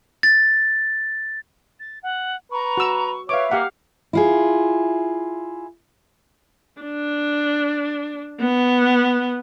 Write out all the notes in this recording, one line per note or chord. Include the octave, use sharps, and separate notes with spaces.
A6
A6
F#5
B4 A#5 C#6
F#4 E6
B4 C#5 E5 F5 D6
A#3 G4 F5 F#5 F6
E4 F4 G#4
D4
B3